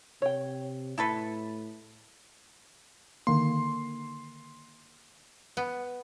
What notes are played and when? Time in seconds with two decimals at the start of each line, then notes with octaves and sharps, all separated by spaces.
0.22 C3 C#5 G5
0.98 A2 E4 A4 B4
3.27 D3 D#3 A#3 C6
5.57 B3